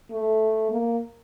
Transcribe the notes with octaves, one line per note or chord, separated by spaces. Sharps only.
A3
A#3